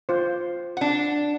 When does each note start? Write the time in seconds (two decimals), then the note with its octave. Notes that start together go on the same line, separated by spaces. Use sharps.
0.09 F4 C5
0.77 D4 F#5